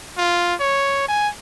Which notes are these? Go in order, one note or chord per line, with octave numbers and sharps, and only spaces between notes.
F4
C#5
G#5